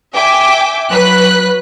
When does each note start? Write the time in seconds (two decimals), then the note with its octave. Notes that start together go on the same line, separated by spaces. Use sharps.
0.14 E5 G5 G#5 D6
0.91 F#3 B4 F#6 B6